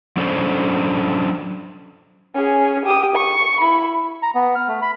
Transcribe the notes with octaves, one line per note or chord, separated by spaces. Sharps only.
F#3 C#4 D4 A4 C5
C#4 G#4
G4 D#6
C#6
E4 B5
A#5
B3
F6
A3
B5